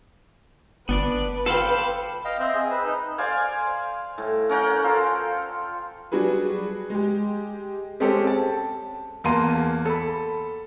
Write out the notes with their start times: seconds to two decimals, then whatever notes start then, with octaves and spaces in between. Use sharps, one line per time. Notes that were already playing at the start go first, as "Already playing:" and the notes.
0.89 G1 B3 D4 B4 D5
1.46 A4 C5 F5 G5 B5 D6
2.25 D#5 F5 G5
2.40 C4 C5 D#5 E5
2.55 G#4
2.71 B4 E6
2.85 D#4
3.18 C5 D5 F5 G#5
4.18 A2
4.49 C#4 A#4 F#5 G5
4.84 F4 A4 C5
6.12 F#3 G3 D4 F#4 G#4 B4
6.90 G#3 G4
8.00 G#3 C4 C#4 G4 A4
8.27 A5
9.24 E2 A#3 A5 A#5 C6 D#7
9.86 A4 B5